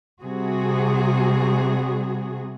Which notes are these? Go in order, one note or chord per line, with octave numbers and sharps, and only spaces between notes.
C3 G3 F#4 G#4